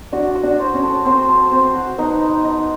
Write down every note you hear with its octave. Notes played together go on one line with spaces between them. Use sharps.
D4 F#4
F#4
D4
C5
C#4
A4
C4 C5
A4
C4 C5
F#4
B3 D#4
D#4
D#4